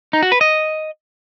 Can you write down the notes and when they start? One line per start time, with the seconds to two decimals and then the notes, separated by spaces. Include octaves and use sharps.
0.13 D#4
0.23 F#4
0.32 B4
0.41 D#5